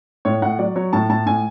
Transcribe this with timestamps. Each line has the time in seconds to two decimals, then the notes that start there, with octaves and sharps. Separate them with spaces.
0.25 A2 C#5
0.42 A2 F#5
0.59 F#3 D5
0.76 F#3 C#5
0.93 A2 A5
1.10 A2 A5
1.26 A2 G#5